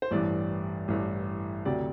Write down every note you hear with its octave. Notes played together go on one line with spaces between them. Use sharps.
C5
A1 G2 E3 D5
A1 G2 E3
D2 C3 F#3 D5